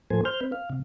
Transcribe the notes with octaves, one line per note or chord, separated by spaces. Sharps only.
A2 F3 A#3 A4 C5 G#5
C5 F6 G6
C4 B4
F5
C3